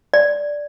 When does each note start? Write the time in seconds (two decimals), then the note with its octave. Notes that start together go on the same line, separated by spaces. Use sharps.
0.14 D5